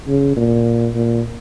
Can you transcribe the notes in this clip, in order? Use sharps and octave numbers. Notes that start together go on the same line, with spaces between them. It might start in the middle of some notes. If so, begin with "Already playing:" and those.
C#3
A#2
A#2